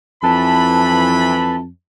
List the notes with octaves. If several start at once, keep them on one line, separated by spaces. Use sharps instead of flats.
F2 E3 A5 B5